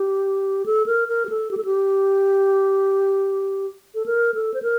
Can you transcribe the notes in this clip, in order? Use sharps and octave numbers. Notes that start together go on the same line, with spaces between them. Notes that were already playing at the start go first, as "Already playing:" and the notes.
Already playing: G4
A4
A#4
A#4
G4
A4
G4
A4
G4
A4
A#4
A4
C5
A#4